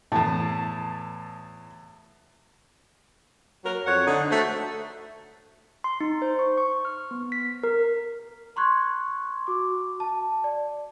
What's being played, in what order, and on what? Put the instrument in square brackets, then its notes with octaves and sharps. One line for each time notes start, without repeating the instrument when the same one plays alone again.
[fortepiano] E2 A2 [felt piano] A5
[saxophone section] F#3 A#4
F2 C#5 F#5
D3 D#4
A3 F#4 C5
[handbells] C6
D#4
C5
C#6
C#6
F6
B3
B6
A#4
[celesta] A#5 C6 C#6 F#6 G#6
F#4 D6
A5
D5